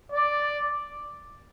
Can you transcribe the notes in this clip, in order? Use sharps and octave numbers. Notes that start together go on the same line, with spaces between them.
D5